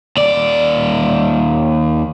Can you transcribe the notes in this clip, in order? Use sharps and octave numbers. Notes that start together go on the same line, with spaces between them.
D#2 D5